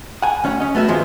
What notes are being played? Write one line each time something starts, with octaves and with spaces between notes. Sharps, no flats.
F#5 G#5
D2 C#4 C#5 F#5
C#4 D#5
A3 B3 F#4 E5
G2 D#3 F3 G#3 B3